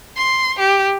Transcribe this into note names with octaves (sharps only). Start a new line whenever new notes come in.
C6
G4